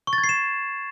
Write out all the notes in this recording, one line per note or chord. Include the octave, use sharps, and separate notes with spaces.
C#6
A6
G#6
C7
E7